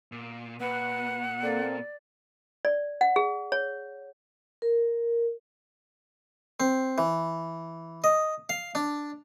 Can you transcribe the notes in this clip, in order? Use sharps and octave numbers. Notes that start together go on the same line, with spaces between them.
A#2
A#2 B4 F#5
A#3 C4 A4 D5
D5
F#5
G#4
C#5
A#4
C4
E3
D#5
F5
D4